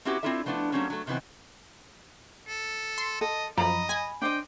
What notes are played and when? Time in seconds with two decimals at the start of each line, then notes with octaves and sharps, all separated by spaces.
0.05 C4 C#4 E4 F#4 G4 B4
0.23 C4 D4 E4 F4 A4 E5
0.46 F3 A3 B3 D4 E4
0.72 F#3 G3 A3 A#3 C4 C#4
0.90 F#3 A3
1.07 C3 D#3 E3 B3 C4
2.48 A4
2.98 C6
3.21 A4 D#5
3.58 F#2 F3 D#5 A#5 B5
3.89 G#5 B5
4.22 D4 C5 D#5 G5